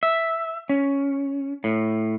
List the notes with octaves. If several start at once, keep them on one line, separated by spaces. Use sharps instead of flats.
E5
C#4
A2